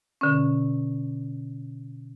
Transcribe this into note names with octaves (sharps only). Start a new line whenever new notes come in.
B2 D3 C#4